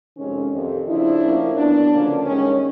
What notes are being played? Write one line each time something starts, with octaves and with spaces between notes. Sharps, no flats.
F2 C3 D#3 G#3 C#4
F2 C3 D#3
F2 C#3 F3 D4 E4
A2 F3 A#3 C#4
A#2 F#3 B3 D4
D2 C#3 F3 A#3 C#4
G2 D#3 G#3 C#4